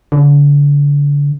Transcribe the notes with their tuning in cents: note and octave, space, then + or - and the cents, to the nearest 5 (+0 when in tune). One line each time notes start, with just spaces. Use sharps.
D3 -35